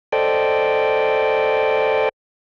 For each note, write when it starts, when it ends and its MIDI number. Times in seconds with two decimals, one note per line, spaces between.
0.12 2.09 69
0.12 2.09 72
0.12 2.09 74
0.12 2.09 75
0.12 2.09 79